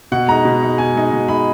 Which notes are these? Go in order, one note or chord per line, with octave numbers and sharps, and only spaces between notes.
B2 F#5
G#3 D#4 A#5
B2
G#3 D#4
B2 G#5
G#3 D#4
B2
G#3 D#4 B5